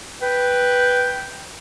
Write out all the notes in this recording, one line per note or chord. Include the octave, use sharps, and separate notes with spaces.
B4 G5